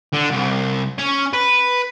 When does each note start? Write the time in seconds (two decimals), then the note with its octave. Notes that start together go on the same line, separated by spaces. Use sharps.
0.13 D3
0.31 C2
0.98 C#4
1.34 B4